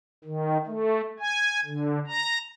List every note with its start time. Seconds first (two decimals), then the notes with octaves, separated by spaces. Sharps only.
0.24 D#3
0.67 A3
1.19 G#5
1.65 D3
2.07 A#5